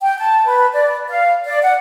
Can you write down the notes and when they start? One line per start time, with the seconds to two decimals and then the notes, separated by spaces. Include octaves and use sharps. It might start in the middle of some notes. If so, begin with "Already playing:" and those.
0.01 G5
0.18 A5
0.46 B4
0.74 D5
1.09 F5
1.46 D5
1.62 F#5